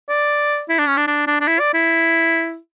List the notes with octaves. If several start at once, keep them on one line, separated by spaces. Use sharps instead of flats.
D5
E4
D4
C#4
D4
D4
D4
D4
E4
D5
E4